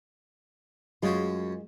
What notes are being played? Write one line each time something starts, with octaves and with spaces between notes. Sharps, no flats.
F#2 G#3 C#4 F4 F#4